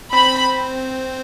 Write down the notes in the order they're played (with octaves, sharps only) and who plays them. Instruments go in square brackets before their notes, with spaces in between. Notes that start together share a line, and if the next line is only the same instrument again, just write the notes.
[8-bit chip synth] C4 C5 [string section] B5